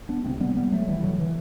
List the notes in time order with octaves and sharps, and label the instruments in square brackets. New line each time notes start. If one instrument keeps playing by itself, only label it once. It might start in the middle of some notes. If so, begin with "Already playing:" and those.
[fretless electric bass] B3 D4
C3 A3 C4
D2
G3 B3
G3 B3
F#3 A3
D2 D3 E3 G3
D3 F#3
E3